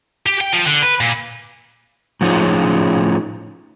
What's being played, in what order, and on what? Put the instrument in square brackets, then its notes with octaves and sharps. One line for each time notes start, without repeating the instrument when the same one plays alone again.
[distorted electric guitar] G4
G5
F3
D3
B4
A#2
[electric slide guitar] A2 F3 C#4 D#4 F4 G#4